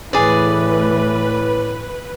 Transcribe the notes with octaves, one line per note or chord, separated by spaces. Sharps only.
A2 E3 A3 G#4 B4 D5